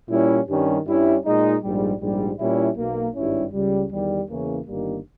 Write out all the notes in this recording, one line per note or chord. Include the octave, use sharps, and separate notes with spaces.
A#2 G3 C#4 E4
G2 D#3 G3 C#4
G2 G3 C#4 E4
A#2 G#3 D#4
A#1 G#2 G3
A#1 G#2 G3
A#2 G3 C#4 E4
B1 B2 A#3
G#1 G2 G3 C#4 E4
C#2 C#3 G3
E2 D#3 G3
E2 C#3 E3 A#3 C#4
G1 G2 D#3 G3 A#3